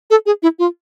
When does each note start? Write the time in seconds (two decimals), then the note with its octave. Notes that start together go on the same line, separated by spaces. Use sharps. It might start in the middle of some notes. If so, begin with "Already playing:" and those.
0.10 A4
0.26 G#4
0.43 E4
0.59 F4